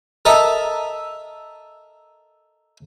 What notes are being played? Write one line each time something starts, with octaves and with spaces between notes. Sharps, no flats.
A4 A#4 D#5 E5 A#5 D#6